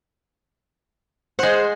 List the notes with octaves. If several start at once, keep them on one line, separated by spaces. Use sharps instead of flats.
G#3 G#4 C5 F#5